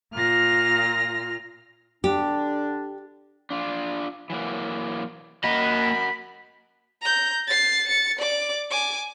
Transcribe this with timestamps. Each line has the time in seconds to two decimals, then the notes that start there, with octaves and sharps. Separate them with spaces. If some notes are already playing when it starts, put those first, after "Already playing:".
0.13 A#2 F4 F6 A#6
2.04 D3 D4 G4
3.50 D4 F4
4.30 E3 F#3 A#3
5.44 A#3 F#4 A#4 D#5 B5
7.02 A#5 G6
7.48 A6 C7
7.88 A6 C#7
8.19 D5 D6
8.71 G#5 D6